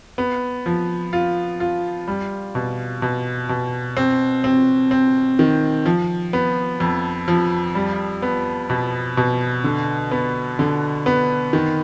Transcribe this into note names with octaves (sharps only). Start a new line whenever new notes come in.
B3
F3
F4
F4
G3
B2
B2
B2
C4
C4
C4
D#3
F3
B3
F2
F3
G3
B3
B2
B2
D3
B3
D3
B3
D#3